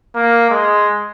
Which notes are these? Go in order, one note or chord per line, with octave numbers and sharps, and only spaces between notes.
A#3
G#3